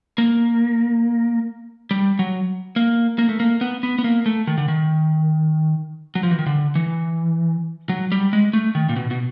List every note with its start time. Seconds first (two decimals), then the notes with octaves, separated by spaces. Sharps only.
0.18 A#3
1.91 G3
2.19 F#3
2.76 A#3
3.18 A#3
3.29 A3
3.40 A#3
3.61 B3
3.83 B3
3.99 B3
4.04 A#3
4.26 A3
4.47 D#3
4.58 D3
4.68 D#3
6.15 F#3
6.23 F3
6.31 E3
6.39 D#3
6.46 D3
6.75 E3
7.89 F#3
8.12 G3
8.33 G#3
8.53 A3
8.75 D#3
8.89 A#2
8.96 B2
9.11 B2